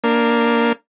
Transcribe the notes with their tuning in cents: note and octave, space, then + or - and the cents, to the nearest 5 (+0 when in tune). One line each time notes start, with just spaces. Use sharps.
A#3 +0 D4 +0